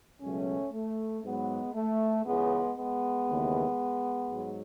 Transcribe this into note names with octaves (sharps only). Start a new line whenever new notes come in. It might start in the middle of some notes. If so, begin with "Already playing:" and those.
C#2 B2 F#3 A3 C#4
A3
G#2 F#3 G#3 B3
A3
C#2 C#3 E3 G#3 B3
G#3 B3
D#2 C#3 E3
G#2 F#3